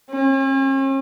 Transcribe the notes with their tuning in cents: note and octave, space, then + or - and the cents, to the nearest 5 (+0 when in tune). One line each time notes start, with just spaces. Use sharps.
C#4 -45